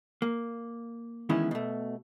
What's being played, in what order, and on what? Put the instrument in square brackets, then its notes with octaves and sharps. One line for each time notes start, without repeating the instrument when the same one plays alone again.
[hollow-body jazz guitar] A#3
D#3 E3 G#3 B3 C#4 E4
B2 A3